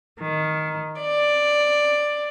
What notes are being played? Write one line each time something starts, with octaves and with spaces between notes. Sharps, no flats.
D#3
D5